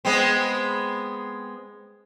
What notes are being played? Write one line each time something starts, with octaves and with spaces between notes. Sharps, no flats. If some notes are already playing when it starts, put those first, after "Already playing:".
G#3 B3 C4